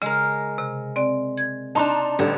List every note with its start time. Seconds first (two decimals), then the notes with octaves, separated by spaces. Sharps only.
0.02 C#3 G#3 A#4
0.58 C3
0.96 C4 D5
1.37 G#6
1.75 D4 D#4 A5 A#5 C6
2.19 A1 D3 G3